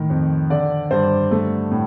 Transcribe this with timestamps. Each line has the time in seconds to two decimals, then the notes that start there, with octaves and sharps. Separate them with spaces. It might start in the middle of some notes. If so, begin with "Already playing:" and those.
Already playing: A2 D#3
0.10 F2
0.50 D3 D5
0.91 G2 C5
1.31 A3
1.71 A2